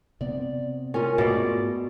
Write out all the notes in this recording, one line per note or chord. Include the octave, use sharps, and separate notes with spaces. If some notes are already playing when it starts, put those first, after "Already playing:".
C3 B3 C4 D5
C#4 F4 G#4 A#4
G#2 B2 A3 D5